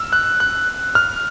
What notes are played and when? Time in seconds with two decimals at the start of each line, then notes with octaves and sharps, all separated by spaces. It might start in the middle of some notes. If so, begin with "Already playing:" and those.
Already playing: E6 F6
0.13 F#6
0.40 F#6
0.95 F6